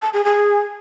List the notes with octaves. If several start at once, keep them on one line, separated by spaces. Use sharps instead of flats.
A5
G#4
G#4